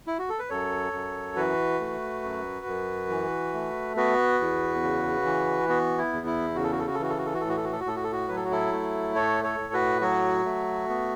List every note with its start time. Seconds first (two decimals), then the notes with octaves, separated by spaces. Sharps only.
0.07 E4
0.19 F#4
0.29 A4
0.39 B4
0.49 F#2 A4 C#5
0.93 F#2
1.36 E3 F#4 B4
1.80 A3
2.23 F#2
2.66 F#2
3.09 E3
3.53 A3
3.97 B3 F#4 B4
4.40 E2
4.83 C#3
5.25 E3
5.69 B3 F#4
5.98 E4
6.13 E2
6.27 E4
6.56 C#3 F#4
6.64 A4
6.72 F#4
6.79 A4
6.87 F#4
6.94 A4
7.00 E3 F#4
7.10 A4
7.18 F#4
7.26 A4
7.34 F#4
7.41 A2 A4
7.49 F#4
7.57 A4
7.64 F#4
7.72 A4
7.80 F#4
7.85 A2 A4
7.96 F#4
8.04 A4
8.12 F#4
8.28 F#3 B4
8.36 A4
8.45 F#4
8.51 E4 A4
8.72 A3
9.15 A2 A4 C#5
9.44 A4 C#5
9.58 A2
9.73 F#4 B4
10.01 F#3 F#4
10.45 A3
10.89 B3